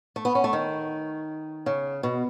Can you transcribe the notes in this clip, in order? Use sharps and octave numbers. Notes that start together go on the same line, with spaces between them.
A3
B3
C#4
A3
D#3
C#3
B2